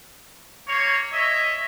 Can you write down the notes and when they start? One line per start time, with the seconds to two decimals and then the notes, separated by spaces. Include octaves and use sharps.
0.68 A#3 C#5
1.12 C#5 D#5 E5